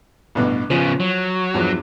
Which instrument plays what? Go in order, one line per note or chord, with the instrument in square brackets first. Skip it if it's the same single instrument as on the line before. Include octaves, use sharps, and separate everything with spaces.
[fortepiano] A1 G2 B2
[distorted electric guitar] C#3 B3 [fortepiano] F3
[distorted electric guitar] F#3
[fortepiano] E2 G2 F3